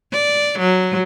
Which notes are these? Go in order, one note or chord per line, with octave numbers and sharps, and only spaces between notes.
D5
F#3